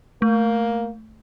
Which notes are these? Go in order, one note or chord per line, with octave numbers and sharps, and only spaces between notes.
A3 A#3